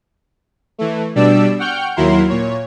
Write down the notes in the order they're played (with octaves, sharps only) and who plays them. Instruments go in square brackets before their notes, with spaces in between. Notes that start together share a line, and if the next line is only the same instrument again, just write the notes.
[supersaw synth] E3 A3
B2 G3 D4 D5 E6
F#5 G5 C#6 F6 G6
D#2 F#3 E4 A#4 C6
A#2 C#5